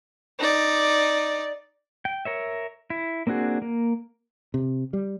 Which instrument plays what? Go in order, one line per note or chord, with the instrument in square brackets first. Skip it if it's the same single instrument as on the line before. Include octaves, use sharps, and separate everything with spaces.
[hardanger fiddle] D#4 D5
[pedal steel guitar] G5
A#4 C#5 E5
E4
A#3 C4 D4 F#4 G#4
A#3
[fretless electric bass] C3
G3